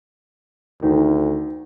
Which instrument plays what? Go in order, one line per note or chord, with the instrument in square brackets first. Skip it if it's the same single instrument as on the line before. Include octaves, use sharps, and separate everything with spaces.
[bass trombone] D2 [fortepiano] D#3